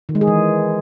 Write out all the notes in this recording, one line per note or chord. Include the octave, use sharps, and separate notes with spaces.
D#3
G#3
G#4
E3